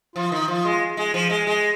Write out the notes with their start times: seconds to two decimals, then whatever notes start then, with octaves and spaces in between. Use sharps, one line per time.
0.16 F3 F4
0.32 D#3
0.48 F3 F4
0.65 G#3
0.97 G#3
1.14 F3
1.30 G#3
1.47 G#3